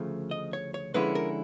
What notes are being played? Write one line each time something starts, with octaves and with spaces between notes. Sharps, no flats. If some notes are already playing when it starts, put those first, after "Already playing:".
Already playing: D2 C#3 F3 A3
D#5
C#5
C#5
D3 F3 G#3 C#4 E4 B4
A#4